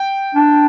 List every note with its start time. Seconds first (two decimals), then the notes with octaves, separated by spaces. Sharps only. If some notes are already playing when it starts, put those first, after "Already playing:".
Already playing: G5
0.35 D4